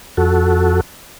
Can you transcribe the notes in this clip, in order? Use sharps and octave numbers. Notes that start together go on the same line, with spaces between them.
F2 F#4 A4